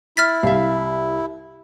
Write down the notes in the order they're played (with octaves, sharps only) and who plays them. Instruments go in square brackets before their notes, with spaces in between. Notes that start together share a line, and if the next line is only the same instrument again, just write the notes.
[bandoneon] E4 [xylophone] F6 A6 B6
[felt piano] C2 [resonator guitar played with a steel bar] E5 F5